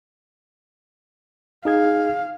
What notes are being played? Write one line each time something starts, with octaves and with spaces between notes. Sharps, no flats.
D#4 G#4 F5 G#6